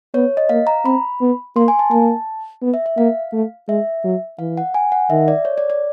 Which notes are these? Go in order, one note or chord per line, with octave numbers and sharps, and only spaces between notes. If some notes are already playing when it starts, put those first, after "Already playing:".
B3 C#5
D#5
A#3 F5
A#5
C4 B5
B3
A#3 C6
G#5
A5
A#3 A5
B3
E5
E5
A#3 F5
A3
G#3 E5
F#3
E3 F5
F#5
G#5
F#5
D#3 E5
D5
C#5
D5
D5